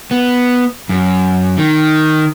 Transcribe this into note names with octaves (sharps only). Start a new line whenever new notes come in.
B3
F#2
D#3